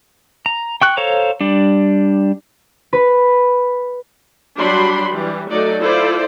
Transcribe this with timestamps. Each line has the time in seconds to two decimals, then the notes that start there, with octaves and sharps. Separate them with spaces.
0.46 A#5
0.81 G5 C#6 F#6
0.97 A4 C5 C#5 F5 A#5
1.41 G3 D4
2.93 B4
4.58 F#3 G3 D4 F#4 B5 C6
5.14 E3 G3
5.50 F#3 A3 D#4 A4 D5
5.80 E4 F4 A4 C5 D5